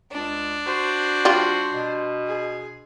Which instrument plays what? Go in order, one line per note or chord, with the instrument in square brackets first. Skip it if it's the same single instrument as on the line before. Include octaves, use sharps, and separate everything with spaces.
[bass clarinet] C#2 [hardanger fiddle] D4
[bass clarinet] F#4 [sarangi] C5
[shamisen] G3 F4
[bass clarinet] B2
[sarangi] G#4